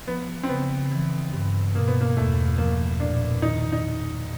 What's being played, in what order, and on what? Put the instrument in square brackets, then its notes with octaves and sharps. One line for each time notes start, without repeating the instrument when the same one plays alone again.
[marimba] F3 [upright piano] B3
[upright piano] C4
[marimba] C#3 [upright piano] B3
[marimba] E3
G2
[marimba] B2 [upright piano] A#3
[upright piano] B3
A#3
[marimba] E2 [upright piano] A3
[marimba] F3 [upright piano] A#3
[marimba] A#2 [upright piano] D4
[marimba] D#3 [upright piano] D#4
[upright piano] D#4